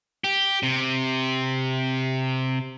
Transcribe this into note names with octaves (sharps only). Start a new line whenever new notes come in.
G4
C3